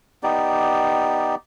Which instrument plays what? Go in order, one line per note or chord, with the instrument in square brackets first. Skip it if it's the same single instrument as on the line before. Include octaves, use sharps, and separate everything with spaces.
[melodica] B3 D#4 G4 D5